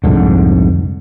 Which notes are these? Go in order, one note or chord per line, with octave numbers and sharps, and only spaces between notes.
C2 F2 G#2 D3